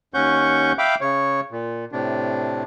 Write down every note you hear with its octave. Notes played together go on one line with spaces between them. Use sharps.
D#2 C#4 F#5 C#6 G6
E5 F5 G5 B5 D6
C#3 C#5
A#2
A2 C3 D4